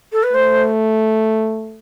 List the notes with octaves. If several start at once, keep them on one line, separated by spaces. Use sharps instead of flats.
A4
B4
A3 C5